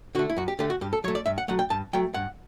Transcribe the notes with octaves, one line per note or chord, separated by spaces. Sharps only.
D3 A3 F#4
E4
F#2 F#4
G4
D3 A3 G4
F#4
G2 G4
A4
F#3 A3 C#5
D5
G2 E5
F#5
F#3 A3 F#5
G5
G2 A5
F#3 A3 G5
G2 F#5